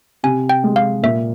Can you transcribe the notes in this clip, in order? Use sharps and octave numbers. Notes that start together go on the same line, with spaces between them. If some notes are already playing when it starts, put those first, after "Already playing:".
C3 G#5
G5
G#3
F5
A#2 E5